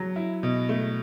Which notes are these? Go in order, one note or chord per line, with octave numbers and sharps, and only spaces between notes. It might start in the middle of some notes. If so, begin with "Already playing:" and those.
Already playing: F#3
E4
B2
A3